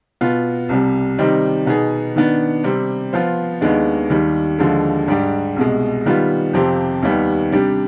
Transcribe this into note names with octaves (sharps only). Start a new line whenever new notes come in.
B2 B3 F4
C2 C3 G3
C3 D#3 G3 C4 D#4
B2 B3 D#4 G#4
D#3 B3 D4
C3 G3 C4
F3 B3 F4 C5
D#2 D#3 G#3 B3 D4
D#2 D#3 G3
D#2 D3 F3 G#3
G#2 G3 D4 G4
C2 B2 G#3
D#3 G3 B3 F4
F2 C3 F3 C4 G4
D#2 D#3 G3 B3
C3 G3 D4 G4